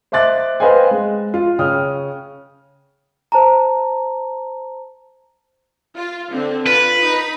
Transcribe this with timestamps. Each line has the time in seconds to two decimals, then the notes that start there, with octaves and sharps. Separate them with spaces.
0.12 C5 D#5 E5 D6 F#6 A6
0.60 B4 C5 D#5 F5 G5 G#5
0.91 G#3
1.34 F4
1.59 C#3 C#4 G5 D#6 F6
3.32 C5 A5 A#5
5.96 F4
6.32 D3 C4
6.66 F4 B4
7.03 D#4 B5